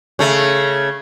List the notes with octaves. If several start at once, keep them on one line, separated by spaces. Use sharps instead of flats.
C#3 A3